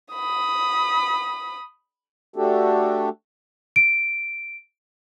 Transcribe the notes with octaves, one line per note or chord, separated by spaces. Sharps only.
B5 D#6
A3 D4 F#4 G4 A4
D7